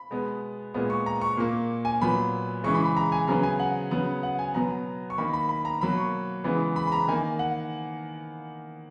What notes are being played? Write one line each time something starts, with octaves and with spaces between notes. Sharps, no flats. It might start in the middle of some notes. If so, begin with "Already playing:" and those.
Already playing: B5
B2 G#3 B3
A#2 G#3 B3
C#6
A#5
C#6
A#2 A#3
G#5
A#2 F#3 B3 B5
C#3 E3 G#3 C#6
B5
B5
A#5
G#5
C#3 F#3 B3 A#5
G#5
F#5
C#3 F#3 B3
F#5
G#5
B2 F#3 B3 A#5
C#6
D#3 A#3 B5
B5
B5
A#5
B2 F#3 A#3 B5
C#6
C#3 E3 G#3 B3
B5
B5
A#5
D#3 A#3 G#5
F#5